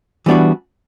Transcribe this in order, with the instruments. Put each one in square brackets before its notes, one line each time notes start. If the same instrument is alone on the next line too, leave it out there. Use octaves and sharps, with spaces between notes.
[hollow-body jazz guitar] E3 G3 B3 D4 F#4